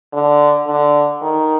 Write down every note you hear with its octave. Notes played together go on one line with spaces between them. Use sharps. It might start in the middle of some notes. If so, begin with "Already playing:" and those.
D3
D3
D#3